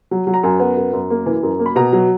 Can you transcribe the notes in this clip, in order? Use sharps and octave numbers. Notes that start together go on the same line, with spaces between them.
F#3
F#3
A#5
F#2 G#5
B3
F#2
F#2
A#3
E3
F#2
A#3
B5
B2 A#5
F#3